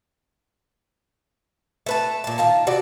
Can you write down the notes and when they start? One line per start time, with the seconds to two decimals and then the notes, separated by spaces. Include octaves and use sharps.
1.86 A3 B4 A5
2.24 A#2 A5
2.38 D#3 F4 A5
2.67 C3 F#4 D5